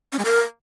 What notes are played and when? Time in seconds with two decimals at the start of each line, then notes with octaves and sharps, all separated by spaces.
0.13 C#4
0.19 G#3
0.25 A#4